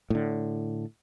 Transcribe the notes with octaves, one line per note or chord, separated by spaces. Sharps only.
A2 D3